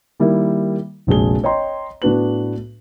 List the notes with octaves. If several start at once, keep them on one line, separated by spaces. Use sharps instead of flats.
D#3 G3 A#3 E4
F1 A#1 G#3 F#4 G#4 G7
C#5 D#5 G5 A#5 C6
A2 B3 D4 F#4 B4 F#7